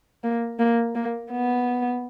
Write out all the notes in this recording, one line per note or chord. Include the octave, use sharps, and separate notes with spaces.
A#3
A#3
A#3
B3